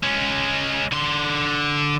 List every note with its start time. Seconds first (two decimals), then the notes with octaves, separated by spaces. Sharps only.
0.03 G#3 C#4
0.92 D3 C6